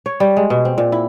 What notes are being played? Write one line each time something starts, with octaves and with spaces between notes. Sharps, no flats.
C#5
G3
G#3
B2
C4
A#2
E4